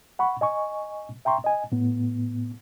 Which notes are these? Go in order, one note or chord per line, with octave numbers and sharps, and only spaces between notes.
F#5 B5 C#6
D#5 G#5 C#6
E5 G5 A#5 C6 C#6
D#5 G#5
A2 B3